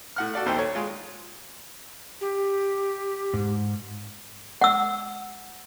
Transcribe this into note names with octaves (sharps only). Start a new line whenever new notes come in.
A2 F#5 F6
F#4 A4 D5 F5
A#1 D#2 A4 C5 G5
C#5
G#3 F4
G4
G#2
F#5 E6